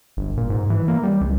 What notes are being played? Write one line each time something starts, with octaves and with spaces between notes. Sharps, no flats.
G1
A#2
G#2
E3
A#3
G3
C#2